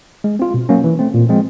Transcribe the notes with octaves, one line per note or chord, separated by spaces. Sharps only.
G#3
C4 F4
B2
F#3 A#3 C#4
E3
A3 C4
A#2
F3 G#3 C4